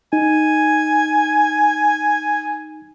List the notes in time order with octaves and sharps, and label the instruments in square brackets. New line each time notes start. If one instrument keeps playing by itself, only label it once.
[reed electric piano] D#4 [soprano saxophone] G#5